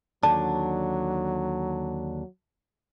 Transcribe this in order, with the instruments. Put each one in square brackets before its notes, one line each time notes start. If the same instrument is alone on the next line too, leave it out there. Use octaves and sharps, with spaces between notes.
[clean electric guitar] D#2 D3 D4 [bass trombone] F#3 [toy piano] A5